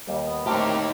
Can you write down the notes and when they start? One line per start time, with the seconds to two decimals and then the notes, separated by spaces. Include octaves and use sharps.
0.07 D#2 G3
0.26 B3
0.46 A2 C4 D#4 G4 A#4